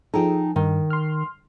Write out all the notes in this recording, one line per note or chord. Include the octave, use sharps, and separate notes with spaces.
F3 D#4 G#4 A4 G5
G2 D#3
C6 F6